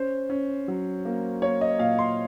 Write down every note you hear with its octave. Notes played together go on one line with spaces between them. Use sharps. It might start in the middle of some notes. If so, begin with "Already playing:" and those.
Already playing: C#4 C5
C#4
F#3
A#3
A#3 C#5
D#5
A#2 F5
C6